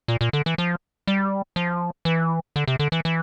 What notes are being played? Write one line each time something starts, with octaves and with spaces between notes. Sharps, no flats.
A#2
A#2
D3
E3
F3
G3
F3
E3
D3
C3
D3
E3
E3